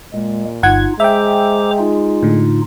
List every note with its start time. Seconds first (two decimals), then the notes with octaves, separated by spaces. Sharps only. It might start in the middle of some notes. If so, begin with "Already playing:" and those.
0.14 A#2 G#3
0.63 G1 D#4 F4 F#5 G#6
1.00 G#3 C5 E5 G5 A#5 D6
1.78 D#4 F4
2.23 A2 D3